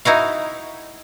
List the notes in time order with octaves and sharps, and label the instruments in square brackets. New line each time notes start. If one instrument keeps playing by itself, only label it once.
[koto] D#4 E4 F#4 F5